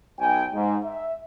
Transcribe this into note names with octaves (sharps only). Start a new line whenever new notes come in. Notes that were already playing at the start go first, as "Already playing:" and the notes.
B1 G5 G#5
G#2
E5